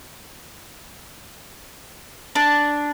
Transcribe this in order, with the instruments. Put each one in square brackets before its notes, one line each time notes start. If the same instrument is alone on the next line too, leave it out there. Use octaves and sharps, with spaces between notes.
[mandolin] D4